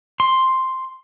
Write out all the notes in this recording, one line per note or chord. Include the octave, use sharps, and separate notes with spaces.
C6